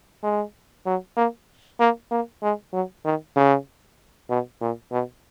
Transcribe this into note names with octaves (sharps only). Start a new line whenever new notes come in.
G#3
F#3
A#3
A#3
A#3
G#3
F#3
D#3
C#3
B2
A#2
B2